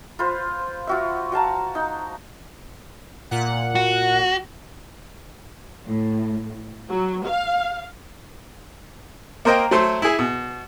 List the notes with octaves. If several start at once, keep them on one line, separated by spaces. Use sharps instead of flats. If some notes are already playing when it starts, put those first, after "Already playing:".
F4 B4 C5
F4 F#4 E5
F#4 F5 A5 A#5
D#4
A#2 F#5
F#4
A2
F#3
F5
A#3 A#4 C5 D#5 G5
F#3 A3 C5 C6
E4 G#4
B2